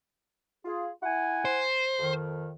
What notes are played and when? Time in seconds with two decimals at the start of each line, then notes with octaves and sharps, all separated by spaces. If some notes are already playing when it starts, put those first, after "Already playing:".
0.64 F4 G#4
1.03 E4 F#5 G#5
1.45 C5
1.99 F2 D#3